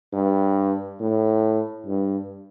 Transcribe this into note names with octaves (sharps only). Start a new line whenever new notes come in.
G2
A2
G2